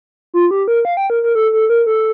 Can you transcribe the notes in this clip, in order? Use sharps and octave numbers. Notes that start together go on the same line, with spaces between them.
F4
G4
A#4
F5
G5
A#4
A#4
A4
A4
A#4
A4